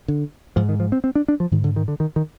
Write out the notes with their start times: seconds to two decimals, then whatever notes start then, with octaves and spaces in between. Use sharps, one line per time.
0.08 D3
0.56 G#2 F3
0.69 D#3
0.80 F3
0.92 C4
1.04 C4
1.15 D4
1.28 D4
1.40 F3
1.51 G#2 D#3
1.64 D3
1.76 D#3
1.88 D3
2.00 D#3
2.16 D#3